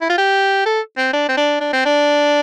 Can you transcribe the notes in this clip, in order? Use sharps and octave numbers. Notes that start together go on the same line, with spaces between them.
E4
F4
G4
A4
C4
D4
C4
D4
D4
C4
D4